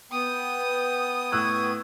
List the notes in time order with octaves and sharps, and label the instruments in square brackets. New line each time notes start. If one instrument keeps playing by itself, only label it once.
[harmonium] B3 G5 [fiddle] D#6
[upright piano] A2 E6 F#6 [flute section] C#6 G#6